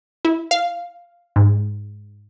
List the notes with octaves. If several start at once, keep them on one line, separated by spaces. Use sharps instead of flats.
E4
F5
G#2